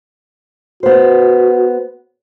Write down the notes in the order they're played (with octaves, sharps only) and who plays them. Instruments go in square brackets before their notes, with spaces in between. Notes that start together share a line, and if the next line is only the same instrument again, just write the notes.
[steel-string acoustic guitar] B3 C5 [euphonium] F#4